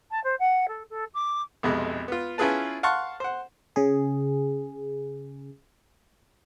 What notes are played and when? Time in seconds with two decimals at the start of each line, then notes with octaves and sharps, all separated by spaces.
0.11 A5
0.23 C5
0.39 F#5
0.68 A4
0.90 A4
1.14 D6
1.63 B1 F2 C3 G#3
2.08 B3 F4
2.38 C#4 E4 F4 G#4 B4 A5
2.83 F5 F#5 A5 C6 C#6 F#6
3.20 C5 F#5
3.76 C#3 G#4